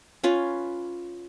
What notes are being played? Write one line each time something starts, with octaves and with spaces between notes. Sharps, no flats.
C#4 F4 B4